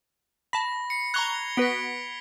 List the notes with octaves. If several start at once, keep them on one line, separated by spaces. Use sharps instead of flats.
A5 B5 A#6 B6
C7 C#7
A#5 C#6 F#6 G#6 F7 G7
B3 F#4 B4 B6 D7